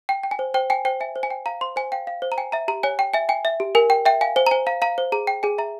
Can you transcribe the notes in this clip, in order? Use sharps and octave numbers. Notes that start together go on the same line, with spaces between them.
G5
G5
G#5
C5
C5 G5
G5 G#5
C5 G5
E5 G#5
C5
G#5
G5
F5 A#5
C5 C6
C5 G#5
F5 G5
F5
C5
A#5
G5 G#5
E5 A#5
G4 A#5
C#5 G#5
G5
E5 G#5
G5 G#5
E5
G4
A#4 G#5
G5
E5 G5
F5 G#5
C5 G#5
A#5
C5 G#5
F5 A#5
F5 A#5
C5
G#4 A#5
G5
G#4 G#5
E5 A#5